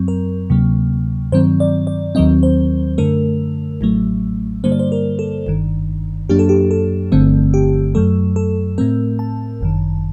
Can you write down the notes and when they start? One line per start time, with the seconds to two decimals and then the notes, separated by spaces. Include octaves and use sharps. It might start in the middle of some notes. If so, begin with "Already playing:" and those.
Already playing: F#2 F#3 C4
0.08 A#4
0.50 D2 C3 F#3 A#3
1.32 G2 D#3 F#3 C4 C5
1.60 D5
1.87 D5
2.15 D#2 D#3 F#3 C4 D#5
2.43 C5
2.98 F#2 D3 A3 A#4
3.81 A1 A2 F#3 A3
4.64 G2 D3 G3 A#3 C5
4.72 D5
4.79 C5
4.92 A#4
5.19 A4
5.47 G1 G2 D#3
6.29 F#2 F#3 A#3 D4 G4
6.39 A4
6.49 G4
6.71 A4
7.12 G1 G2 D3 A3 C4
7.54 G4
7.95 F#2 F#3 A3 A4
8.36 A4
8.78 A2 A3 C4 A#4
9.19 A5
9.61 G1 F#2 D#3